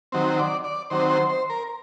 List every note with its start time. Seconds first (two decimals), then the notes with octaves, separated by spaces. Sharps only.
0.12 D#3 F#3 C4
0.39 D5
0.64 D5
0.90 D#3 F#3 C4 C5
1.10 C5
1.29 C5
1.50 A#4